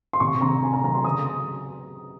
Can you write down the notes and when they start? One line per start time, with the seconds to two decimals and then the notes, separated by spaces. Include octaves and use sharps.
0.13 C6
0.20 C3 C#6
0.41 C3 A#5
0.62 C4 G#5
0.73 A#5
0.84 F#3 A#5
0.95 C6
1.04 C#3 D#6